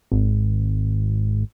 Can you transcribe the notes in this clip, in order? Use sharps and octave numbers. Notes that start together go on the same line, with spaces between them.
G#1